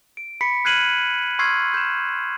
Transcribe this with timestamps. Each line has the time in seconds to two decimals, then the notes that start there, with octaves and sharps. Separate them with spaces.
0.17 D7
0.41 B5 B6 C#7
0.65 F6 F#6 G#6 C7 D#7 F#7
1.39 C6 C#6 E6 F6 G#6 C7
1.74 G6 E7